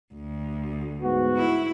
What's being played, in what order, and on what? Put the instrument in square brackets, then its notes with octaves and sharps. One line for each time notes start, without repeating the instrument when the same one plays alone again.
[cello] D2
[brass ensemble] G#2 B3 F#4
[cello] E4